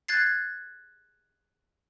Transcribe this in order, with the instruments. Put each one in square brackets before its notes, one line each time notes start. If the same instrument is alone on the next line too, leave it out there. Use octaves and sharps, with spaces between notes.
[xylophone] F#6 G#6 A6 C7